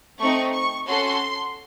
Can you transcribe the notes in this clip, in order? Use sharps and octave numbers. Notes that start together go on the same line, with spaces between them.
A3 C4 D#4 C#6
C#6
C#4 F#4 A4 C6